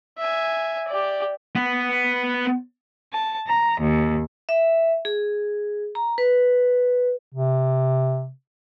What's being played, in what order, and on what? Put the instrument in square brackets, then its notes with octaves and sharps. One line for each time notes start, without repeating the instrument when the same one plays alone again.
[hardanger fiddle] E5 G#5
G4 D5
[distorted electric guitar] B3
[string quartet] A5
A#5
D#2
[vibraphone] E5
G#4
A#5
B4
[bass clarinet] C3